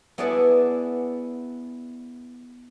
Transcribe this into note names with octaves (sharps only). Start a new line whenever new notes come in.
B3 E4 G#4 D5 F#5 A5